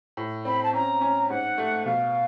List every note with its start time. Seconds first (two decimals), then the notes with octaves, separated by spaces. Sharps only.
0.17 A2
0.45 C4 B5
0.63 A5
0.73 C#4 A#5
1.01 C#4
1.30 G#2 F#5
1.58 A3
1.86 B2 F5